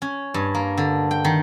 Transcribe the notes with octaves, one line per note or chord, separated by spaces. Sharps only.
C#4
G2
A#3
D3
G5
D#3